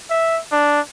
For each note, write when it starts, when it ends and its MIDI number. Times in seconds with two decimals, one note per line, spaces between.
0.10 0.39 76
0.52 0.80 62